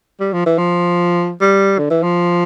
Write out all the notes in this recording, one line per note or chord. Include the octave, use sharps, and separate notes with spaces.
G3
F3
E3
F3
G3
D3
E3
F3